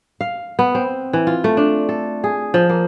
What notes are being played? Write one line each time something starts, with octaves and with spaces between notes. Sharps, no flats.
F5
B3
C4
E3
F4
A3
D4
A4
G#4
F3
A#3